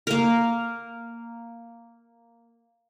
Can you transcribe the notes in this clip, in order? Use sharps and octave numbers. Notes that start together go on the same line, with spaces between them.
A#3 A#4